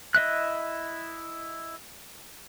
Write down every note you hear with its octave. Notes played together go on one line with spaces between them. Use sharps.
E4 D#5 E5 F#6